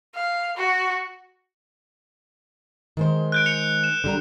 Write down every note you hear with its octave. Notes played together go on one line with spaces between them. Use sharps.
F5
F#4
D#3 G#3 C5
F#6 G6 D7
C#7 F7
E7
D3 G3 A#5